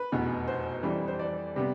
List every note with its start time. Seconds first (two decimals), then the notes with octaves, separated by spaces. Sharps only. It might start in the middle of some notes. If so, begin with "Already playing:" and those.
Already playing: B4
0.12 F1 E2 B2 B3
0.48 C5
0.83 F2 E3 G3
1.08 C5
1.19 D5
1.56 C3 G3 B3